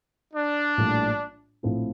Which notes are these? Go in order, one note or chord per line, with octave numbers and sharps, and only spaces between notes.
D4
A#1 A2 G3 A#3
A#1 A2 F3 C4 E4